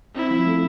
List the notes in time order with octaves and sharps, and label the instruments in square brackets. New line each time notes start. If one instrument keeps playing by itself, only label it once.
[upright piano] C4 [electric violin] E4
[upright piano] F3
A3